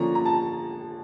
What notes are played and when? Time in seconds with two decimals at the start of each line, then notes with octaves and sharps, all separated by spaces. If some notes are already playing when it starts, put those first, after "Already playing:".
Already playing: D3 F3 A#3 C#4 A#5
0.15 A#5
0.25 A5